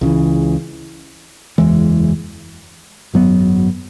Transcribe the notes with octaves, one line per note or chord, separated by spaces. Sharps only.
C#2 C#3 E3
F#1 E2 E3 G#3
G#1 F#2 F#3 B3